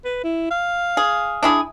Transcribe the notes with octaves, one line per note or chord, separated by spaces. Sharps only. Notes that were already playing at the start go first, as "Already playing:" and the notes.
B4
E4
F5
G#4
D4 E4 G#4